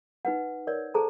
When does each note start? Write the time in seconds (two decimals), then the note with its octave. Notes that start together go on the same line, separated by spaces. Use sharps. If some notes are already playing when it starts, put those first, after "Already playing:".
0.25 D#4 B4 F#5
0.67 A#4 C#5 D5
0.94 G#4 A4 C5 A5 A#5